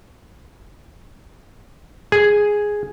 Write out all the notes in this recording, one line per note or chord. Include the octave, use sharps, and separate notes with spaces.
G#4